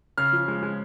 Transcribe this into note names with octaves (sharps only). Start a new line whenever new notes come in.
C#3 F6
F3
G#3
G#3